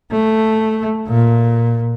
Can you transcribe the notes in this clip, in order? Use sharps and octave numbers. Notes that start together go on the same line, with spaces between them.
A3
A#2